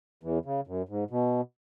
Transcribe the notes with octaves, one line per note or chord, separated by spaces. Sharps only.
E2 E3
C#3
F#2
G#2
B2